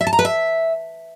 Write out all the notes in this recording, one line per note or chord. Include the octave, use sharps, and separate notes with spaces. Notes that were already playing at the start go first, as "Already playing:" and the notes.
E5
A5
A#5
B4
E5